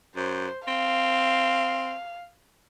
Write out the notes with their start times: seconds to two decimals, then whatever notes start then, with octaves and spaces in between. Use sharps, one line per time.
0.16 F#2 C5
0.68 C4 F5